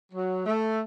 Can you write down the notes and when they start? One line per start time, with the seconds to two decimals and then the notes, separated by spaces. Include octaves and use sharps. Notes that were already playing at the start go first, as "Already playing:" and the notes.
0.13 F#3
0.46 A3